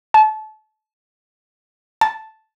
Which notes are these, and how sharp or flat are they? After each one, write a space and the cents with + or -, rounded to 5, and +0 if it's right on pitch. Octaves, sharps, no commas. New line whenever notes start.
A5 -30
A5 -5